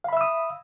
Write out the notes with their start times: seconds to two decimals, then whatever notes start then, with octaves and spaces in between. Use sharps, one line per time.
0.04 F5
0.09 B5
0.13 E5
0.17 E6
0.21 D#6